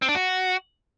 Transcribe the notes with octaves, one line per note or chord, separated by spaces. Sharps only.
C4
D4
F#4